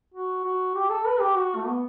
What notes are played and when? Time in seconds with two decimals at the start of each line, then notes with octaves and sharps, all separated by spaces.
0.14 F#4
0.44 F#4
0.75 G4
0.90 A4
1.06 B4
1.20 G4
1.36 F#4
1.56 A3
1.67 B3